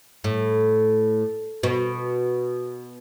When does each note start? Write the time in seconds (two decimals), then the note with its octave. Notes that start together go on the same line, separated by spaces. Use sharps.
0.24 A2
1.63 B2